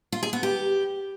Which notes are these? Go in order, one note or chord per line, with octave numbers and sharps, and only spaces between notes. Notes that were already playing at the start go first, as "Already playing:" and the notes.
F4
G#4
B3
G4